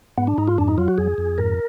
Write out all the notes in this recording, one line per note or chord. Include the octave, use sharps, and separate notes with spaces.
G#2 B3
D4
G#2 D#4
F4
F2 D4
D#4
F#3 F4
F#4
F2 G#4
F2
G#2 A#4